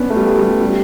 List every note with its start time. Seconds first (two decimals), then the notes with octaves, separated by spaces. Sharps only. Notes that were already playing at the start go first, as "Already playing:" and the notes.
Already playing: B3 C#4 D4
0.10 A3
0.16 G3
0.38 G3
0.61 G3